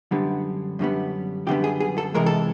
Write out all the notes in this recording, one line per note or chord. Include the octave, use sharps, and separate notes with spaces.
F#2 D3 G3 B3
F#2 D3 G3 B3
F#2 D3 G3 B3 G4
G#4
G#4
A4
C3 E3 G#3 A#4
A4